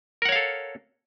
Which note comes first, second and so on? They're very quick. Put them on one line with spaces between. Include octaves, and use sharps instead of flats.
A#4 F#5 C#5 F5 A4